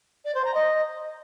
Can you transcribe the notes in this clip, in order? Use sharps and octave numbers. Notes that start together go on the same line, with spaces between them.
D5
C5
A#5
D#5